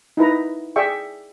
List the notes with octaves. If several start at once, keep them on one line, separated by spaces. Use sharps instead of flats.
D#4 E4 B4 A#5
G#4 D5 E5 G5 C#6